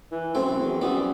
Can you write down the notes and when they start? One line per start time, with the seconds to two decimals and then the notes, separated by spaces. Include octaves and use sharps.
0.11 E3
0.35 F#2 A3 C4
0.58 E2
0.81 F#2 G3 B3